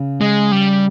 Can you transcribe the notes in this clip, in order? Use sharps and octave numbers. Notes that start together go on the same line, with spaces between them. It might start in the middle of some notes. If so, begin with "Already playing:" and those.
Already playing: C#3
G#3
G3